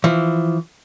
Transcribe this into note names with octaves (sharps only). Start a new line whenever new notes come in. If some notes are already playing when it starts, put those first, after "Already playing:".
E3 F3